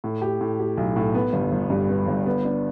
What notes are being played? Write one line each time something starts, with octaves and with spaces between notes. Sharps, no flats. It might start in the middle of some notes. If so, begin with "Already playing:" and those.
A2
G4
A2
G4
B1
A2
B3
G1
G1
G2
B3
G1
B3
D4